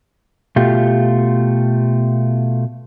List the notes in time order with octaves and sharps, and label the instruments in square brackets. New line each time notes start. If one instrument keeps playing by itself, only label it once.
[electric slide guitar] B2 A3 F4 G4